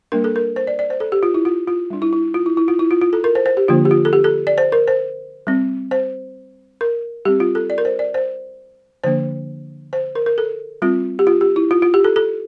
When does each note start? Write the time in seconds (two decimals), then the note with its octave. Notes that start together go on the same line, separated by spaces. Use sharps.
0.12 G3 A#3 D4 A#4
0.24 A4
0.36 A#4
0.56 C5
0.67 D5
0.79 D5
0.90 C5
1.00 A4
1.12 G4
1.23 F4
1.34 E4
1.45 F4
1.68 F4
1.90 G3 D4
2.02 E4
2.13 E4
2.34 F4
2.46 E4
2.57 E4
2.68 F4
2.79 E4
2.91 F4
3.01 F4
3.13 A4
3.24 A#4
3.35 C5
3.46 C5
3.57 G4
3.68 D3 F3 A#3 D4 F4
3.85 G4
3.91 F4
4.05 A4
4.13 G4
4.24 A4
4.47 D5
4.58 C5
4.72 A#4
4.88 C5
5.47 G3 C4
5.91 C5
6.81 A#4
7.25 G3 C4 G4
7.40 F4
7.55 A4
7.70 D5
7.78 A#4
7.85 C5
7.99 D5
8.14 C5
9.04 D3 F3 A#3 D4 C5
9.93 C5
10.15 A#4
10.26 A#4
10.38 A4
10.82 G3 C4 F4
11.19 G4
11.27 F4
11.41 G4
11.56 E4
11.71 F4
11.82 F4
11.94 G4
12.04 A4
12.16 A4